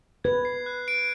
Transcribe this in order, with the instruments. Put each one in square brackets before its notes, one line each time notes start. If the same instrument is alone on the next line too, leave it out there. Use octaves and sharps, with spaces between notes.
[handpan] B4 [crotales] G#6
[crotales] C7
F#6
D7